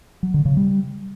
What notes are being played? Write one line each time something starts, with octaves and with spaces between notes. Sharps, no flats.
F#3
D3
C#3
G3